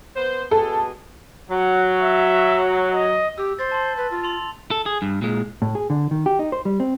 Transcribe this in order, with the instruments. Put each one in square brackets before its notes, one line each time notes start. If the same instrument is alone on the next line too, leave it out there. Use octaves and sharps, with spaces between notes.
[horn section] B3 B4 C5
[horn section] G2 B2 G#4 [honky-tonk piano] A4
[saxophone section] F#3 [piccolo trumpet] F#5
[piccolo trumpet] E5
D#5
[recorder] G4 [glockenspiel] E6
[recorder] C5 [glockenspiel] A6
[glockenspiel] A5 C6
[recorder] B4
F4
[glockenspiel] C6 F7
[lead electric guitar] A4
G#4
G2
A#2 G#3
[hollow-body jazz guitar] A2
G#4
D3
D#3
G4
D#4
C5
G3
C4